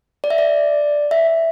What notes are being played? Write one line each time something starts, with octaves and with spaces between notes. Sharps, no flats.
D5
E5
D5
E5